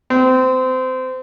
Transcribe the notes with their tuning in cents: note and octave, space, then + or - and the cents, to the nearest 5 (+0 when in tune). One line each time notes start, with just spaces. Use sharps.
C4 -25